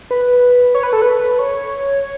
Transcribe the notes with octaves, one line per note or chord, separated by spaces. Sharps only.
B4
C#5
B4
A4
B4
C#5